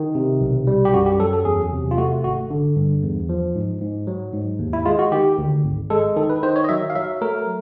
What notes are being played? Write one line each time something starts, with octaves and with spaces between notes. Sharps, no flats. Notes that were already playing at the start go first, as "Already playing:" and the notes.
Already playing: D#3
C3
B1
G3
G4
F#2 F#4
G4
F#3 A4
A4
E2 G#4
C3
F4
A3 F#4
G#1 F#4
D3
G2
E2
F3
G#2
G#2
F#3
G#2
D#2
E4
G#3 F4
F#4
D#3 G4
D2
G#1
G#3 A4
D#3 A4
B4
D#3 C5
C#5
D#5
F#3 E5
F5
F#3 E5
A3 A#4